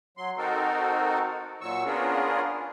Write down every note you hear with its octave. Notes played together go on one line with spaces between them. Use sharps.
F#3 C6
C4 D#4 F#4 A4 A#4
A#2 F#3 C#6 E6
B3 C#4 D4 F4 G#4 A#4